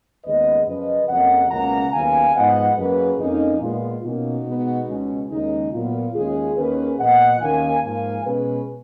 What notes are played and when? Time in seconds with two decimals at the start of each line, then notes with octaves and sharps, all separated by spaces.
0.24 D#2 C#3 G#3 B3 B4 D#5
0.66 F#2 C#3 F3 B4 D#5
1.08 F2 C#3 F#3 A#3 D#5 F#5
1.51 C#2 B2 A#3 C#4 F#5 A#5
1.93 D#2 C#3 F#3 B3 F5 G#5
2.35 G#2 F3 B3 D#5 F#5
2.77 F#2 C#3 F#3 A#3 G#4 B4
3.19 F2 F3 A#3 C#4 D#4
3.61 A#2 G#3 B3 F4
4.04 B2 A#3 C#4 D#4 F#4
4.46 B2 G#3 B3
4.89 C#2 B2 G#3 C#4
5.31 D#2 C#3 G#3 D#4
5.73 A#2 F#3 B3 F4
6.15 D#2 C#3 G#3 C#4 F4 G#4
6.57 D#2 D#3 A#3 C#4 G#4 B4
6.99 A#2 F3 B3 D#5 F#5
7.41 D#2 D#3 A#3 C#4 F5 G#5
7.84 G#2 F3 A#3 F5 G#5
8.25 B2 G#3 C#4 G#4 B4